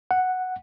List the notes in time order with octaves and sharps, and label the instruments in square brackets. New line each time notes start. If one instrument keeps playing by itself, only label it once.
[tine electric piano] F#5